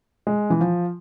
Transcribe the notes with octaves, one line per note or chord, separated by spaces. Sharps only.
G#3
E3
F3